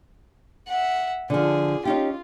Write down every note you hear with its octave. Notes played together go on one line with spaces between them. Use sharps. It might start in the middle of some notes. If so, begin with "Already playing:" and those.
E5 F#5
D3 F3 G#4
C#4 D#4 F4 G4